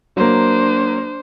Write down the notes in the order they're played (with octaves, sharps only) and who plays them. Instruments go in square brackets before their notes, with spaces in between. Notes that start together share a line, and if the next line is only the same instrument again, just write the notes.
[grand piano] F#3 A#3 [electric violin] D4 C5